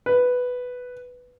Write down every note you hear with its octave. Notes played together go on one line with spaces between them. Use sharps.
B4